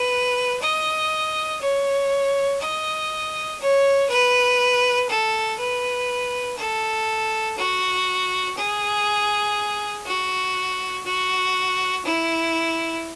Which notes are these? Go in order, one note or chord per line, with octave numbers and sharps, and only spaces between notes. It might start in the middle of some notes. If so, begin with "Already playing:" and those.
Already playing: B4
D#5
C#5
D#5
C#5
B4
A4
B4
A4
F#4
G#4
F#4
F#4
E4